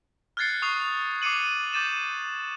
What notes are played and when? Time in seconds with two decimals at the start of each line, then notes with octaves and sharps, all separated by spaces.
0.37 F6 F#6 G#6 A6 C7 C#7
0.62 C#6 D#6 C7 F7
1.22 D6 C7 C#7 D#7 F#7
1.73 D6 G6 A6 D#7 E7